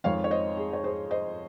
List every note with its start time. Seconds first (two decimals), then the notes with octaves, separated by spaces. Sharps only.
0.04 F2 D#3 G#3 C#5 F5
0.24 C#5
0.31 C5 D#5
0.57 G#4
0.73 C#5
0.84 G#4 C5
1.11 C5 D#5